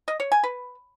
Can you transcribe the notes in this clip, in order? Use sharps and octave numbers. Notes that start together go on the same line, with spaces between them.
D#5
C#5
G#5
B4